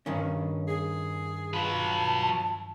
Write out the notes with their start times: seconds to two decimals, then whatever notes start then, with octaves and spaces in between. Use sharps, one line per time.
0.06 G2 D#3 C#4 D#4
0.68 G#4
1.54 F#3 F4 B4 A5